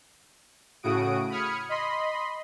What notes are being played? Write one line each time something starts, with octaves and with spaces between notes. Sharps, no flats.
A2 C#3 F#4 D#6 D7
B5 D#6 F6 G#6 C#7
D#5 B5 C6